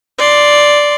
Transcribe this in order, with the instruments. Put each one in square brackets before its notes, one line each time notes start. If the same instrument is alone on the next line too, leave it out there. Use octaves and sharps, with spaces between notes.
[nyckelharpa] D5 C6